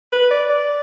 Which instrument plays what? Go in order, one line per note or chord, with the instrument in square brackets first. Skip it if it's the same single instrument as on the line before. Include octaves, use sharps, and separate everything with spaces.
[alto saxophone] B4
D5
D5